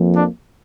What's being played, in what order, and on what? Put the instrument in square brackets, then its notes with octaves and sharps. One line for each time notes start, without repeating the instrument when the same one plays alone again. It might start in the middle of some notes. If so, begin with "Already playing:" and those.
Already playing: [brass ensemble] F2 F3 A#3
D4